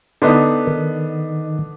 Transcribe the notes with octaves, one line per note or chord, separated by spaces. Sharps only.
D3 B3 D#4
D#3